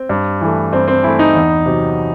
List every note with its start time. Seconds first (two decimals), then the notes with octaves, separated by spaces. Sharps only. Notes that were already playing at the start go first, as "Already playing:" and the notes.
Already playing: C4
0.09 G2
0.41 E3 A3
0.73 G2 C4
0.88 C4
1.03 E3 A3 E4
1.19 D#4
1.35 E2
1.66 C3 F#3